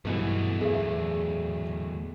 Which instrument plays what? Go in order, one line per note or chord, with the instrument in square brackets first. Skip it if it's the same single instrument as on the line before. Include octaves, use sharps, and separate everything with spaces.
[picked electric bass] G2 B2 E3 [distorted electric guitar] F#3 A3
[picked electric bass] E2 [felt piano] G#4 E5